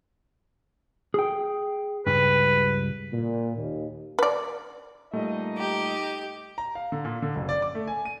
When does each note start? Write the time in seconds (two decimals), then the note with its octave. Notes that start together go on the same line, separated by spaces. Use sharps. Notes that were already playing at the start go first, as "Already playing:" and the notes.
1.14 G#4 G5
2.06 C#2 G2 B4
3.13 A#2
3.57 D#2
4.19 B4 D5
5.13 A#2 G3 A3 D#4 D#5
5.57 G4
6.58 A#5
6.75 F5
6.92 D3
7.05 A#2
7.22 D3
7.36 F#1
7.49 D5
7.62 D6
7.75 A3
7.87 G#5
8.05 D#7